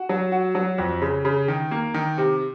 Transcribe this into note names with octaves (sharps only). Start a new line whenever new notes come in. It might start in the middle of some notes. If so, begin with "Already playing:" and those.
Already playing: F#4
F#3
F#4
F#3
F2
C#3
C#3
D#3
A#3
D#3
C3